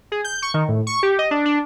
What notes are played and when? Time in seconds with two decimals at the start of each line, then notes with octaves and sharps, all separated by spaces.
0.12 G#4
0.24 G6
0.42 C#6
0.54 D#3
0.68 A2
0.87 C#6
1.03 G4
1.19 D#5
1.31 D4
1.45 D4